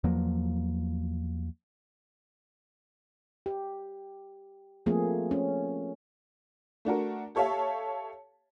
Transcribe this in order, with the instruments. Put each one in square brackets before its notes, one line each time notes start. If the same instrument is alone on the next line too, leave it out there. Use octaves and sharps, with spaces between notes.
[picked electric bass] E2 F3 F#3 A#3
[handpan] G4
F3 A3 A#3 C4 G#4
C#4
[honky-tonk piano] A3 D4 F#4 A#4
G4 A4 C#5 E5 F5 A5